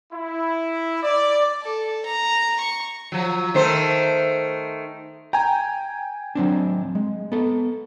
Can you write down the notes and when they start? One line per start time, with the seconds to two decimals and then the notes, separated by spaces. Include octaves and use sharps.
0.12 E4
1.02 D5
1.63 A4
2.05 A#5
2.60 C#6
3.12 F3 F#3
3.54 D#3 A3 C5
5.33 G5 G#5 A#5
6.35 F#3 C4 D4
6.95 G#3
7.32 B3 A4